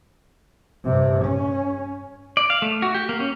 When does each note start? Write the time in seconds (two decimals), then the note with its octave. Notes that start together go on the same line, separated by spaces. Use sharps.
0.85 G2 C3
1.25 C#4
2.37 D5
2.50 F5
2.62 A3
2.82 F#4
2.94 G4
3.09 A#3
3.20 C#4